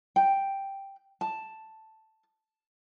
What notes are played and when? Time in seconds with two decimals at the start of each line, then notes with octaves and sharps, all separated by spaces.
0.16 G5
1.21 A5